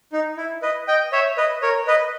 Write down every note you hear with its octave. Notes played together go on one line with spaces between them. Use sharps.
D#4
E4
B4 D#5
D#5 G5
C#5 E5
B4 D#5
A#4 C#5
B4 D#5